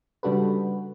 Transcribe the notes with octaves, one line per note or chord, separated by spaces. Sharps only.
C#3 G3 D4 F#4 A4 B4